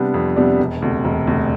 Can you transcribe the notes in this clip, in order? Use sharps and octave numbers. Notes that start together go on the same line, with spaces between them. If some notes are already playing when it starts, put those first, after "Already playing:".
Already playing: C3 G3 B3 D4
F2
C3 G3 B3 D4
E1
D2 C3
E1
D2 C3